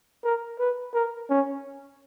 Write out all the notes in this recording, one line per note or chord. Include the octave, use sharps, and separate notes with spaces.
A#4
B4
A#4
C#4